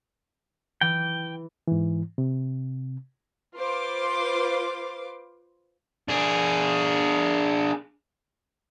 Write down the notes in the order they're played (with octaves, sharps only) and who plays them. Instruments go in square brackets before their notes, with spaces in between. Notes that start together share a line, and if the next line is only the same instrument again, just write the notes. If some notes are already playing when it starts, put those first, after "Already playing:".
[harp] E3 [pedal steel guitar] G5
[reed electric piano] G#2 E3
C3
[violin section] F4 B4 C5 C6 D6
[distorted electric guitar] D4 G#4